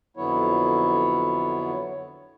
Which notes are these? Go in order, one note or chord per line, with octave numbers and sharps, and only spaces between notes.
F2 D3 F#3 B3 E4 C#5